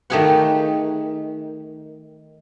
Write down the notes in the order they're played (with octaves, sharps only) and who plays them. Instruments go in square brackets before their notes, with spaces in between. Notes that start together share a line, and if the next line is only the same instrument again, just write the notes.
[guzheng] D#3 A3 G4 G#4 F5 F#5